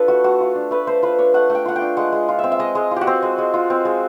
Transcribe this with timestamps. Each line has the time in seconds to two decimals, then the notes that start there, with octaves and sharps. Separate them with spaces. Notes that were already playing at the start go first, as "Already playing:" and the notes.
Already playing: D4 F4 A4 B4
0.08 A3 F#4
0.24 A3 F#4
0.41 F4
0.55 D4
0.71 A3 B4
0.87 A3 C5
1.03 F4 B4
1.19 D4 C#5
1.34 A3 F#5
1.50 A3
1.55 G5
1.66 F4 F#5
1.76 G5
1.81 D4
1.97 G#3 F#5
2.12 G#3
2.29 F4
2.39 C4 E5
2.52 E5
2.59 G#3 D#5
2.75 G#3
2.91 F4
2.96 F#4 G4
3.07 C4
3.23 G#3
3.38 G#3
3.54 F4
3.70 C4
3.85 G#3